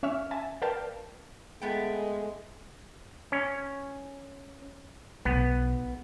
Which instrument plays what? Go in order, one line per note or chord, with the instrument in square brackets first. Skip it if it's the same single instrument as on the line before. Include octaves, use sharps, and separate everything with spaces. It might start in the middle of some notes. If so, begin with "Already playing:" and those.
[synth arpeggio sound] C#4 E5 C#6 F6
E5 G#5 A5
A#4 B4 D5 F5 G5 A5
[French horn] G#3 [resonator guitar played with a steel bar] A3 B3 G5 [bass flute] A4
[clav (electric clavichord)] C#4
[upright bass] B1 [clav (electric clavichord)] B3